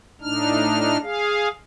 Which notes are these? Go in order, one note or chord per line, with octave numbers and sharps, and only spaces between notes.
A2 D4 D#4 F6
G#4 F5